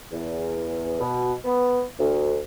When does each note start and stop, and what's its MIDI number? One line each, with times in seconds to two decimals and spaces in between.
0.12 1.00 40
1.00 1.32 47
1.45 1.80 59
1.98 2.39 38